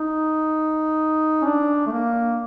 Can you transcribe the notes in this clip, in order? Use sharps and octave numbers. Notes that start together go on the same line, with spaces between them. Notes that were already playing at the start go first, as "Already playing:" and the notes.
Already playing: D#4
C#4
D4
A3
A#3